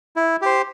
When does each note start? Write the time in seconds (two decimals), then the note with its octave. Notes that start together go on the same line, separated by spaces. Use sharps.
0.16 E4
0.42 G4 C5